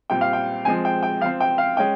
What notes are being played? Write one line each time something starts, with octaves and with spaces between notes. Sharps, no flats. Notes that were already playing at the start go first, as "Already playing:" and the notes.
A#2 G3 C4 G5
F5
G5
F3 G#3 C4 G#5
G5
G5
F3 C4 F5
G5
F5
G#3 C#4 G5